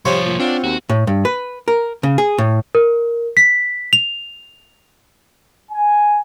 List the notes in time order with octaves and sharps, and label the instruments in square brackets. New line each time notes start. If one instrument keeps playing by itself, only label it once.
[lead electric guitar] C2 F3 [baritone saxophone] G3 [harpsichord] C5 C#5 F5
[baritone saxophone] A#2
[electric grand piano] C4 F#5 [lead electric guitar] D4 [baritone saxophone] F4
[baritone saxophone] D#2 [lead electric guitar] F#4
[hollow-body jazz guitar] A2
G2
B4
A#4
C#3
G#4
A2
[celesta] A#4
B6
F7
[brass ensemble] G#5